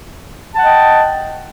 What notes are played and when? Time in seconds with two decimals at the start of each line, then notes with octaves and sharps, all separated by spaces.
0.54 A5
0.58 F#5
0.61 D#5
0.64 G5